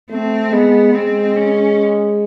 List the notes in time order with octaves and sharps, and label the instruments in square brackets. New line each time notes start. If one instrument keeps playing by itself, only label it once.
[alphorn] A3 [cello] C4
[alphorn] G#3 [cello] B3
[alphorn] G#3 [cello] C4
[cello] C#4